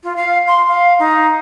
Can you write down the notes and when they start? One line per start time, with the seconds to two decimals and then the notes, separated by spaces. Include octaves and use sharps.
0.04 F4
0.16 F5
0.47 C6
0.68 F5
0.99 D#4